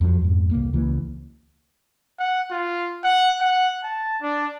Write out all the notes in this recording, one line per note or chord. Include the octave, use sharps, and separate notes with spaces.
F2 F3 F#3
F2 G#2
C2 A#3
C#2 E3 A#3
F#5
F4
F#5
F#5
A5
D4